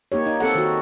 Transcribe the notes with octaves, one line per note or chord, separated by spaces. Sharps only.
A#3 D#4 G4 C#5
D#4
C4 A4 F#5
D#3 F#4